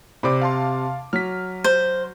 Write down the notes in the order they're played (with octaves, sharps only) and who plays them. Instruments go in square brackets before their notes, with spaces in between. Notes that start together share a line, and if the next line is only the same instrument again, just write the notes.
[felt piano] C3 D6 [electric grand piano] C5 D5 B5
[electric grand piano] F5 A5 C6
[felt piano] F#3 [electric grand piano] F6 B6
[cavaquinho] C5